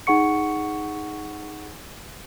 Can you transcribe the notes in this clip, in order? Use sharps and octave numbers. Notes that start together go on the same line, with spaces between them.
D#4 G#4 F#5 C#6 C#7